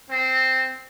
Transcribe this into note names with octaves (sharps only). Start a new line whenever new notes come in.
C4